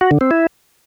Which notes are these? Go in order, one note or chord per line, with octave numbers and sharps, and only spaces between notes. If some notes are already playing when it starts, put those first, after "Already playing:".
F#4
D3
C4
E4